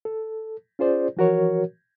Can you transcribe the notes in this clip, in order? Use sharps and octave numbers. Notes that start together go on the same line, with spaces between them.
A4
C#4 F4 G#4 C5 D5
E3 F3 F#4 A#4 C#5